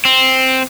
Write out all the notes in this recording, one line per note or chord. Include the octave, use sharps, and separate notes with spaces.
C4